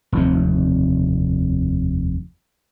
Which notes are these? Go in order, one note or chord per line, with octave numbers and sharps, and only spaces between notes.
F1 D#2 C3